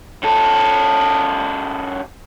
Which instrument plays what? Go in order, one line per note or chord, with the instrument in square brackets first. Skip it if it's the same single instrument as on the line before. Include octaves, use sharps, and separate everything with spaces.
[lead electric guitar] F#2 A4